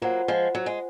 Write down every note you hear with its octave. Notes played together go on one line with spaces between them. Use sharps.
F#3 A#3 F4 C5 F#5
F3 G#3
F#3
G#3